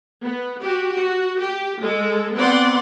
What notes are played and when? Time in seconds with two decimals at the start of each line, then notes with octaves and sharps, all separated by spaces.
0.23 B3
0.62 F#4 G4
0.94 F#4
1.40 G4
1.82 G#3 A4
2.37 B3 C4 D5 F#5 C6